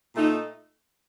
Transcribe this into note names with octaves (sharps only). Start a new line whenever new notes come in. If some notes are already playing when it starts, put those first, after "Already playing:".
A#2 A3 D#4